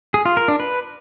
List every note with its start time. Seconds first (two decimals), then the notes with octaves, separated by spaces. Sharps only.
0.14 G#4
0.26 F4
0.37 A#4
0.48 D4
0.60 B4